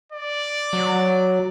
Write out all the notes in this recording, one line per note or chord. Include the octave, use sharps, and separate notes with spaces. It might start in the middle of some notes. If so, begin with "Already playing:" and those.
D5
F#3